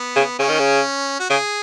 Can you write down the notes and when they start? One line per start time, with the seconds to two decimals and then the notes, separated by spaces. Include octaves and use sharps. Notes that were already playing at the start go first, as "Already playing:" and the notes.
Already playing: B3
0.16 C#3
0.39 C#3 C#4
0.49 D#3
0.59 C#3
1.20 F#4
1.30 C#3 G#4